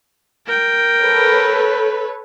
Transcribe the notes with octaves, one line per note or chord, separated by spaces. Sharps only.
A#4 G5
A4 B4 C#5